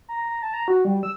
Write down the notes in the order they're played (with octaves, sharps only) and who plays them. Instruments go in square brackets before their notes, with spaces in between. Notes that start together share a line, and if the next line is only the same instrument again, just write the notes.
[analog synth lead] A#5
A#5
A5
A#5
F#4
G3
E6